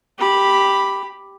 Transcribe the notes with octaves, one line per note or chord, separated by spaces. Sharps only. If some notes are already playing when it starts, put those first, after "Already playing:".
G4 B5